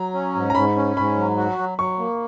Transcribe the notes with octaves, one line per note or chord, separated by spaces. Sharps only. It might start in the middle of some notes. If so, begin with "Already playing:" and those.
Already playing: F#3 A#5
C#4
G#2
A#5
G#2 B5
C#4
G#2 B5
F#3
F#4
F#3
F#3 C#6
A#3